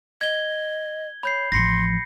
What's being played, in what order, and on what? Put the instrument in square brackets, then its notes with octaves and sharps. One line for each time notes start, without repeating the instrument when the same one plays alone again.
[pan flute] D#5 [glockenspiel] G#6 G7
[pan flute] C#5 [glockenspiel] B5 G6 C7
[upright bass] A1 F3 [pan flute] C6 [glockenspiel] A#6 C7 C#7